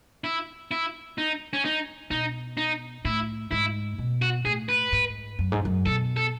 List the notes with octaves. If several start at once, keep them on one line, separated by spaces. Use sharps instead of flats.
E4
E4
D#4
C#4
D#4
B2 D#4
D#4
A2 E4
G#2 E4
B2
F#4
A2 G#4
B4
G#2
F#2
G#2
F#2
B2 A4
A4